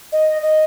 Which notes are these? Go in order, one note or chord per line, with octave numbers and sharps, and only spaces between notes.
D#5
D#5